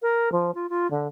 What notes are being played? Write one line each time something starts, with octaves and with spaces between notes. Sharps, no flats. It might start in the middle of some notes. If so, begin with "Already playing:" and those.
A#4
F3
F4
F4
D3